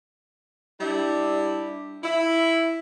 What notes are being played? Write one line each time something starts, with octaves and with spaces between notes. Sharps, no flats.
G3 D4 E4
E4